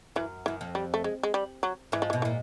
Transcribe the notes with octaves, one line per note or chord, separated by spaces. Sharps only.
F#2 E3
F#2 E3
F2
G3
A3
G#3
G#3
G3
F#3
G#2 E3
F3
E3
B2
A#2 E3